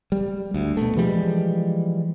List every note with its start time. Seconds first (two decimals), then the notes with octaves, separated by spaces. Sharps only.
0.12 G3
0.54 D2
0.77 B2 A3
0.97 E3 F3 G3 G#3